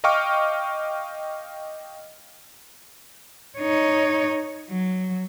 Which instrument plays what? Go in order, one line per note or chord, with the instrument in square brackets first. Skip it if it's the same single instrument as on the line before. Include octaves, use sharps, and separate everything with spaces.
[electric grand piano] D#5 F5 G5 C#6 D6 F6
[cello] D#4 C#5
F#3